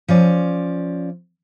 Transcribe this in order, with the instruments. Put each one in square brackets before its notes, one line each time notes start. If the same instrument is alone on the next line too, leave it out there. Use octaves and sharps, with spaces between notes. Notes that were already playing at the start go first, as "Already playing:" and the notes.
[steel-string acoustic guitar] F3 C#4 D5